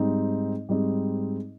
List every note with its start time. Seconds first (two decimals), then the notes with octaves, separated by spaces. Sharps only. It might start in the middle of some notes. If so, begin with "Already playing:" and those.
Already playing: G#2 G3 C4 D#4
0.69 G#2 G3 C4 D#4